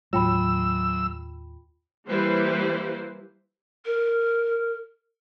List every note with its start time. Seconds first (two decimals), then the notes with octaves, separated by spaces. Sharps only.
0.13 D#2 A2 F#3 G#3 F4 G5 B5 E6
2.08 E3 G3 A#3 E4 B4 C5
3.86 A#4